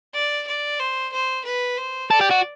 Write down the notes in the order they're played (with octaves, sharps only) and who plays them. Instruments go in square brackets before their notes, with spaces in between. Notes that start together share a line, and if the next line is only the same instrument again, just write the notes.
[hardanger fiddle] D5
D5
C5
C5
B4
C5
[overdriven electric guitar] A4 [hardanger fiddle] D5
[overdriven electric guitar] G4
F#4